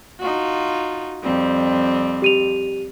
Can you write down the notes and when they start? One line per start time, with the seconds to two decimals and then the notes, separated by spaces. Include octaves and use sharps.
0.20 D#4 F4 F#4
1.23 F2 G3 C4
2.22 G4 D#7 F7